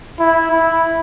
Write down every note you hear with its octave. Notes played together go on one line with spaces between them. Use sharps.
E4
E4